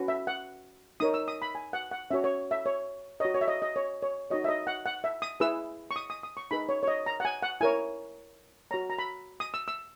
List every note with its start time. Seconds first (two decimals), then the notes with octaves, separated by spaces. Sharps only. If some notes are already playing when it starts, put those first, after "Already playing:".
Already playing: C#4 F#4 B4
0.08 E5
0.27 F#5
1.00 D#4 A#4 C#5 D#6
1.14 E6
1.28 D#6
1.42 B5
1.55 G#5
1.73 F#5
1.91 F#5
2.10 C#4 F#4 C#5 E5
2.24 C#5
2.51 E5
2.66 C#5
3.20 F#4 C#5 D#5
3.34 C#5
3.41 E5
3.48 D#5
3.62 D#5
3.76 C#5
4.02 C#5
4.30 D#4 F#4 C#5 D#5
4.44 E5
4.48 D#5
4.67 F#5
4.86 F#5
5.04 E5
5.22 D#6
5.40 E4 G#4 B4 E6
5.91 C#6
5.96 D#6
6.10 D#6
6.23 D#6
6.37 C#6
6.51 D#4 G#4 B4 B5
6.69 C#5
6.83 C#5
6.88 D#5
7.06 A#5
7.20 F#5
7.25 G#5
7.42 F#5
7.61 E4 A#4 C#5 G#5
8.71 F#4 C#5 A#5
8.90 A#5
8.99 B5
9.40 D#6
9.54 E6
9.68 E6